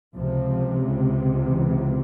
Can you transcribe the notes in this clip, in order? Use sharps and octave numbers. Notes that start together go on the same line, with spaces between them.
C#2 C3 F3
C#3
E3